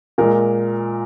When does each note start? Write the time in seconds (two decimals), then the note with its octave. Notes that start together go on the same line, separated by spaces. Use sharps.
0.18 A#2 G#3 A#4